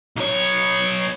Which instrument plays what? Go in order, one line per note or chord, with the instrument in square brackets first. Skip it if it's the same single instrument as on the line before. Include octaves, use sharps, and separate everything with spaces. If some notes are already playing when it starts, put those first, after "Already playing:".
[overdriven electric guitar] B1 C#5